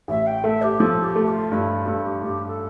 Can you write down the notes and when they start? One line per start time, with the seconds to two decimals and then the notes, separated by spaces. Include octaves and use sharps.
0.08 A1 E5
0.26 G5
0.44 A3 E5
0.62 G4
0.80 F3 A4
1.03 G4
1.16 A3
1.28 F4
1.51 G2 E4
1.68 F4
1.86 G2 A4
2.04 G4
2.22 G2 G4
2.46 A4